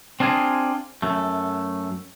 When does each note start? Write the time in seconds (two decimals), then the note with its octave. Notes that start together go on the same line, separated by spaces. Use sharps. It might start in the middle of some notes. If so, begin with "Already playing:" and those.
0.20 C4 D4 F4 G#4 G#5
1.02 F#2 A3